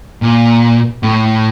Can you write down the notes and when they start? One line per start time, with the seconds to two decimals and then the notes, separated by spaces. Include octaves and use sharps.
0.22 A#2
1.03 A2